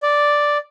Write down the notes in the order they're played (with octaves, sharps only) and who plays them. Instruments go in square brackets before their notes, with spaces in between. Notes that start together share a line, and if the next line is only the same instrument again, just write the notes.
[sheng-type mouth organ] D5